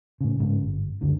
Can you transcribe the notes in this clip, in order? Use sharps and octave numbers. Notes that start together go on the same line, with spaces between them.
A2 C#3
G#2 C#3
G1
F#1 C#2 D3